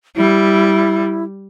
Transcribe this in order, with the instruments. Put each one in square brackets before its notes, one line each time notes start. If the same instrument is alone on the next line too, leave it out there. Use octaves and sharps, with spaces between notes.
[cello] G3 [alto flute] E4